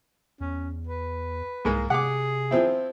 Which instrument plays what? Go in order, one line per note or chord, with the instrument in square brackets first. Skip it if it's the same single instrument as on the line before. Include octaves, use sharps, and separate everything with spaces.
[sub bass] E2 [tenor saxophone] C#4
[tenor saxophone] B4
[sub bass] C2 [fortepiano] G#2 G#3 A#3
[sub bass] C3 [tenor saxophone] G#4 [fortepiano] F#5 D6
[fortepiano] F3 C4 E4